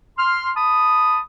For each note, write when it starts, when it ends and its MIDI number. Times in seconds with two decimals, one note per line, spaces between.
0.18 0.50 84
0.18 0.50 89
0.56 1.19 81
0.56 1.19 83
0.56 1.19 87